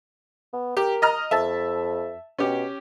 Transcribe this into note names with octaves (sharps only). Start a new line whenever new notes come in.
B3
G4 A#4
D#5 A#5 F6
F2 E5 A5
B2 C#4 G4